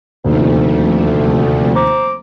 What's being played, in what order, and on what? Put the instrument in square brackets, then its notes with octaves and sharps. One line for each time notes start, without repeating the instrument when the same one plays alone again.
[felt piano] D#1 D#4 [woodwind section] D2 [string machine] C3 F3 A3
[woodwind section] C5 A#5 D6